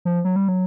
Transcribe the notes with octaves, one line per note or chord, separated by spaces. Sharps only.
F3
F#3
G3
F#3